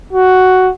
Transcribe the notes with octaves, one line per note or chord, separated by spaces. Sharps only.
F#4